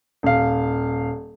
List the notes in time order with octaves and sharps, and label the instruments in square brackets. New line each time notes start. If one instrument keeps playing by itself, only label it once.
[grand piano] D#1 F5